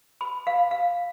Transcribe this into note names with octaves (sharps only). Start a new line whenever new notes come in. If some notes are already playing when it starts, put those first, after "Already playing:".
B5
F5
F5